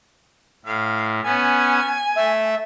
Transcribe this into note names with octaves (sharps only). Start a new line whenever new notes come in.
A2 F5
B3 C#4 G#5
A3 E5